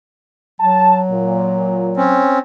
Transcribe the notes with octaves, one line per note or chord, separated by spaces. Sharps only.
F#3 A5
A#2
C4 C#4